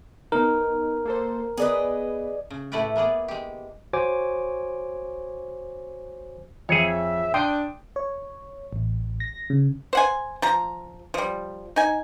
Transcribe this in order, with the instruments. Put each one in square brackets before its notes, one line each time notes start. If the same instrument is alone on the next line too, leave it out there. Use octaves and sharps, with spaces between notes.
[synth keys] B3 D#4 [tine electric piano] A#4
[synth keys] A#3 A4 C5
[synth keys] B3 B4 [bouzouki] G#4 D5 D#5
[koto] C#3
A2 A3 E4 B4 D5 G5
A#3 B3 G#4 D5
G#3 G4
[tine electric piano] F#4 C5 C#5 G#5 D6
[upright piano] F2 [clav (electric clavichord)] G#4 C#5 [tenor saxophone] E5
[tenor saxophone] D4 [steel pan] G5 C6 D#6 [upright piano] D7
[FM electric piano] C#5
A1
A#6
C#3
[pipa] C5 F#5 G#5
F3 A#5
F3 G3
D#4 G#5